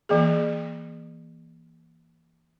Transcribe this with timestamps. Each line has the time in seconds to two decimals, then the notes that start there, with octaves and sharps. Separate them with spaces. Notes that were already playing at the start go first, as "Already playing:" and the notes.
0.09 E3 A#3 G#4